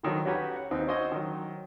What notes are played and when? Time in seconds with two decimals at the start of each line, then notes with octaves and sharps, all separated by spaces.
0.03 D3 D#3 F3 F#3
0.25 C#4 F#4 G4 B4 C#5 A#5
0.56 F#5
0.71 D#2 C4 D#4 B4
0.87 C#4 D4 F#4 C5 C#5 D#5
1.12 D#3 F#3